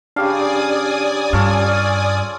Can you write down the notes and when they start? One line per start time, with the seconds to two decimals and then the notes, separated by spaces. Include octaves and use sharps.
0.16 C#3 D4 G4 D5 F5 G#5 D#6
1.33 G2 C#4 F4 A4